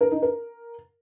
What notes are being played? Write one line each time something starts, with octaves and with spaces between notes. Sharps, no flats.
A#4
D#4
A#4